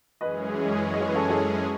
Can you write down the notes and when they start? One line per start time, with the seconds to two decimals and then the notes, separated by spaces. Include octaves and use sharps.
0.20 F#2 E3 G#3 C#4 G#4 B4 D#5
0.94 D#5
1.01 C#5
1.08 B4
1.15 A4 C#5
1.30 A4 C#5